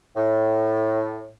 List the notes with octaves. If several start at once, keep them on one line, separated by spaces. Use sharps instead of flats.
A2